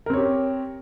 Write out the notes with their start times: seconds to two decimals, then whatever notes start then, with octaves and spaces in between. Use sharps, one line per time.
0.06 A#4
0.10 C4
0.13 C#5
0.17 G4